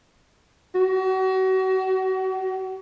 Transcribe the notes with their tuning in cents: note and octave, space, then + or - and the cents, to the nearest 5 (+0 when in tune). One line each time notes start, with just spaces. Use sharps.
F#4 +35